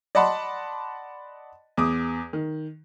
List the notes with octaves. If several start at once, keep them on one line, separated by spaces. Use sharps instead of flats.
D5 D#5 F#5 A5 B5 C6
E2 D6 D#6
D#3